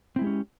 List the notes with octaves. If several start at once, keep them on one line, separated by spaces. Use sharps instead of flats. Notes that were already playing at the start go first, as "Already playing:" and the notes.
G#3 C4 C#4 E4 G4